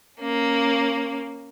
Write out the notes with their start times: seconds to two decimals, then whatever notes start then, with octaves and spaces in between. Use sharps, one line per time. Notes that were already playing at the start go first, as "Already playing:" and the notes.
0.20 A#3 C#4